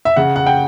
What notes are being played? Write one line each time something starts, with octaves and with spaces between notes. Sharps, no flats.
E5
C#3 F#5
F#5
G5